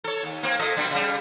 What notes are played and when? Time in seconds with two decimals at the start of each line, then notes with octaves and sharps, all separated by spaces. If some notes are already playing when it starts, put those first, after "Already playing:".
0.04 A4 C#5
0.23 D#2
0.43 A#3 C4
0.59 A#2 A4 D#5
0.77 B2 G3 D4
0.91 C#3 G3